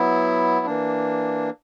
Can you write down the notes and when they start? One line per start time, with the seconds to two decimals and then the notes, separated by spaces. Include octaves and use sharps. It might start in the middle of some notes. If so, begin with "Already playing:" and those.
Already playing: F#3 B3 E4
0.66 E3 A#3 D4